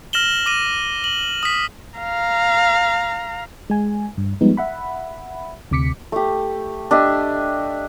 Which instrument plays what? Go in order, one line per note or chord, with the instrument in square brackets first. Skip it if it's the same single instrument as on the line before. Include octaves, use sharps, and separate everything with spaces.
[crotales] F6 A#6 E7 F#7 G7
D6 A#6 D#7
F#7
D#6 B6
[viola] F5 A#5
[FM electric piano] G#3 G#5
G2
F3 G3 G#3 B3 D#4
E5 F#5 B5
D2 C3 D6 B6 C#7
[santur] A3 G4
D4 G4 D#5 E5